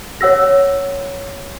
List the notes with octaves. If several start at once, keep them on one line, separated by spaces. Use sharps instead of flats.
C#5 F#5 E6 A#6